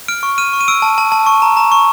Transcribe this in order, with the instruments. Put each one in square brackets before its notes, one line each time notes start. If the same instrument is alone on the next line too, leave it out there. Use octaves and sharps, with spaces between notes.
[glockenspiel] F6 D7
C#6
F6 D#7
C#6
D#7
E6 D7
A5
A5
A5
C#6
A#5
A#5
C#6